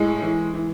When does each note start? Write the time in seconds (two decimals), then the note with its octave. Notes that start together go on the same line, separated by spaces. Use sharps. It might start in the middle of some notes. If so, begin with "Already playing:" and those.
Already playing: A2 G#3
0.22 E3
0.54 E3